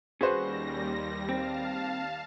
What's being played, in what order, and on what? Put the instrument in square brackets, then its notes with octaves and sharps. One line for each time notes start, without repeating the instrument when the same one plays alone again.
[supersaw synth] D#2 G3 A#6 [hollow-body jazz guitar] C#4 F#4 [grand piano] G#4 B4 C5
[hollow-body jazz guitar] C4 [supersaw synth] F5 A5